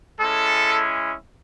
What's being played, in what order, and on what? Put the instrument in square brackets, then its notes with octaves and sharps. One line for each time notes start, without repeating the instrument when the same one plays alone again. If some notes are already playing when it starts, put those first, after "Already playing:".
[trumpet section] G#3 C#4 E4 A4